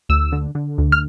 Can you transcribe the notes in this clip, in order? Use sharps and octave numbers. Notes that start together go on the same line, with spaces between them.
D2 E6
D3
D3
D2
F6